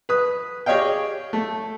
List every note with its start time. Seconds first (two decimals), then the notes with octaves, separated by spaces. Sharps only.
0.09 B4 D#6
0.66 G4 G#4 C#5 D#5 F5 G5
1.33 A3